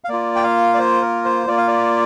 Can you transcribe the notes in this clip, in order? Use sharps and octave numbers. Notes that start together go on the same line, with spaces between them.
F5
A#3 F4 D5
G5
F5
D5
C5
A#4
C5
A#3 F4 D5
F5
D5